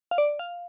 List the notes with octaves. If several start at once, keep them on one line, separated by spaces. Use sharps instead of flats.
F5
D5
F5